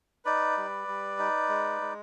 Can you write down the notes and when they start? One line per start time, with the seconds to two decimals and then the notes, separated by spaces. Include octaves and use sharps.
0.25 D#4 B4 D5
0.57 G3
0.88 G3
1.19 D#4
1.49 G#3
1.81 G#3